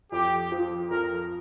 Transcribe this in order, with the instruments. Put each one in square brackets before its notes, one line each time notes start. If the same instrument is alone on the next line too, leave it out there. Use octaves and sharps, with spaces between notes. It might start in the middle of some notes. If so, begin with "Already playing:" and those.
[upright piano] F2 [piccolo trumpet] G4
[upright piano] F3
[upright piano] F2 [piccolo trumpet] A#4